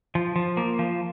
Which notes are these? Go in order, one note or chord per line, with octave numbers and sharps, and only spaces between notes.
F3
F3
A#3
F3